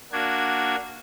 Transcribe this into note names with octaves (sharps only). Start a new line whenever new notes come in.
A#3 D4 F#4 G#6